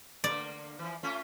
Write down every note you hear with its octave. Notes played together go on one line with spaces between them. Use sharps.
D3 A#3 D5
E3 F3
A3 C#4 F4